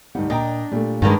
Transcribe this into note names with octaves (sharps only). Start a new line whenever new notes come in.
D2 G2 G3 D#4 F#5
A#2 D4 D#5 G5 A#5
A#2 G3 A3
G2 D#3 G#3 A#3 D4 B4 A5